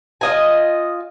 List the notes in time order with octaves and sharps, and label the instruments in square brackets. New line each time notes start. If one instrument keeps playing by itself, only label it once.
[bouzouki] F4 D#5 G#5